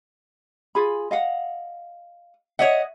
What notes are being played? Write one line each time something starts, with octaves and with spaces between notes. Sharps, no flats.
F4 G#4 B5
D#5 F5 F#5
C#5 D#5 E5 F#5